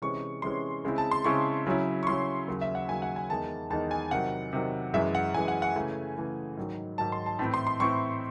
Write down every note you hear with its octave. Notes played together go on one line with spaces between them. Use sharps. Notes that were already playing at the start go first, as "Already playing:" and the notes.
C3 E3 G#3 C#4 C#6
C3 E3 G#3 C#4 C6
C#3 G#3 C4 E4
A5
C6
C#3 G#3 C4 E4 C#6
C#3 F#3 C#4 E4
C#6
C#3 F#3 C#4 E4 C6
D#2 C#3 F#3
E5
F#5
D#2 C#3 F#3 G#5
F#5
G#5
E2 D#3 G#3 D#4 A5
E2 D#3 G#3 D#4 A5
G#5
C3 D#3 F#3 F#5
C3 D#3 F#3
F#2 E3 G#3 E5
F#5
F#2 E3 G#3 G#5
F#5
F#5
C#3 E3 A3 G#5
C#3 E3 A3
G#2 D#3 F#3
G#2 D#3 F#3 A5
C6
A5
A2 E3 C4 E4 A5
C6
C6
A2 E3 C4 E4 C#6